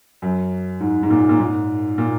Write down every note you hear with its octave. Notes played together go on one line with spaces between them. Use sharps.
F#2
G#2
G#2
A#2
A#2
G#2
A#2